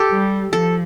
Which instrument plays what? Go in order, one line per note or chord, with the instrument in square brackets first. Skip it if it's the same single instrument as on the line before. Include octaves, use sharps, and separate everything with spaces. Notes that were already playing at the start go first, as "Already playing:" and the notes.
Already playing: [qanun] G4 A4
[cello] G3
[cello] F3 [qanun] A4